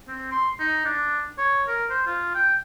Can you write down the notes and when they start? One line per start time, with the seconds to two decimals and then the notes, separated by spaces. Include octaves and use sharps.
0.08 C4
0.32 C6
0.60 D#4
0.85 D4
1.38 C#5
1.68 A#4
1.90 C5
2.07 F4
2.35 G5